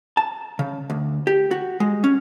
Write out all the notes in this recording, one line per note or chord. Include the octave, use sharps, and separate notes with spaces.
A5
C#3
D2
G4
F#4
G#3
C#4